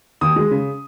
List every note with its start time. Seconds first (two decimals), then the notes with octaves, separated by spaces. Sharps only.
0.21 D#2 D#6
0.36 G#3
0.51 C#3